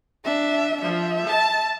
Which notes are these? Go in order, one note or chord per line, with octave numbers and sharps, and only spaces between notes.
D4 E5
F3 E5
A5